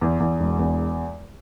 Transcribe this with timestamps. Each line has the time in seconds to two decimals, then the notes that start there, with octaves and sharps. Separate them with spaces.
0.01 E2
0.20 E2
0.40 E1
0.59 E2